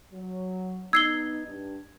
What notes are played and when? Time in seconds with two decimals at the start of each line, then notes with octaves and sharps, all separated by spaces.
0.13 F#3
0.93 B3 D#4 E6 G#6 C7 G7
1.46 G2